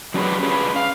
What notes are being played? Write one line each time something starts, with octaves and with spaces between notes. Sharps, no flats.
F#3 C#4 D4 G4 G#4 B4
C#4 D4 G#4 B4
F5